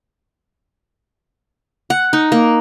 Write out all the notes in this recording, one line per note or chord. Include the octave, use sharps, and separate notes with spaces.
F#5
D#4
A#3